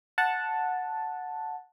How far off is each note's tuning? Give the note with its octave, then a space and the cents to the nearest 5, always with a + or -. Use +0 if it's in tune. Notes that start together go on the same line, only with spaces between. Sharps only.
F#5 -10 A5 +0